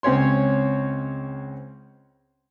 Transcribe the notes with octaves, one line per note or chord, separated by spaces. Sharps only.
C#2 C4 C#4 C#5 C6